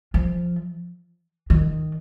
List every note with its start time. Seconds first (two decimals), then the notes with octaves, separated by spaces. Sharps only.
0.14 F3
1.50 D#3